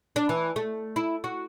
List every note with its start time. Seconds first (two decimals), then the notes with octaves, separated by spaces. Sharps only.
0.16 D4
0.29 E3
0.56 A3
0.96 E4
1.24 F#4